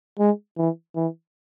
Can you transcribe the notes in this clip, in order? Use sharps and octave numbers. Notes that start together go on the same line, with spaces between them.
G#3
E3
E3